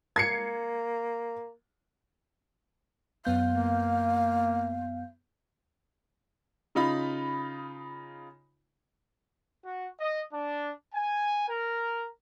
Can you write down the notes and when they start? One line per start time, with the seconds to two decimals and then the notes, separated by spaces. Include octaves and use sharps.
0.16 A#3 G#6 C7 C#7
3.25 F#2 B3 F5 G6
3.48 A#3
6.75 C#3 D#4 F4 B5
9.65 F#4
10.00 D#5
10.32 D4
10.94 G#5
11.50 A#4